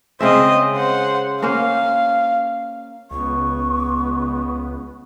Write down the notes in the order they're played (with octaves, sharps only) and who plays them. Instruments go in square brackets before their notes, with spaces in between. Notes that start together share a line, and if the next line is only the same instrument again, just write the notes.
[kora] C#3 G#3 E5 [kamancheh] C4 D#5
[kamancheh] C5 F#5
[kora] A#3 C#4 C5 [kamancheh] F5
[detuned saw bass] C#2 [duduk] B3 [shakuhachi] C#6